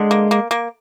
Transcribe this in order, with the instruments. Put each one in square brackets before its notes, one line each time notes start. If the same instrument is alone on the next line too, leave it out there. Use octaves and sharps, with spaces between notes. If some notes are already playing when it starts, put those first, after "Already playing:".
Already playing: [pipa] D3 [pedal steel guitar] G#3
[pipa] A#3
A#3
A#3